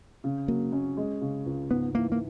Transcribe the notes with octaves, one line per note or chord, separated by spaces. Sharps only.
C#3
F#3 A#3
C#4
G#3
C#3
C#2
G#2 B3
E3 A#3
A#3